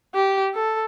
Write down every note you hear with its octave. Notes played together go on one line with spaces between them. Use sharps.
G4
A4